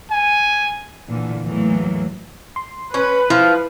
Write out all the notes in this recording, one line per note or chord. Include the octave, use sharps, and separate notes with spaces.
G#5
A#2 D3 E3
E2 A2 E3 F#3 A3 A#3
C6
C#4 B4
F3 E4